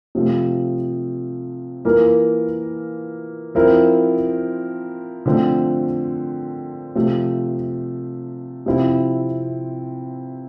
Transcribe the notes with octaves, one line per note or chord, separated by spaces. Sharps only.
C3 F3 A3
E3 A#3 F4 A#4
F3 C4 E4 A#4
D3 F3 A3 C4
C3 F3 A3
C3 F3 C4 E4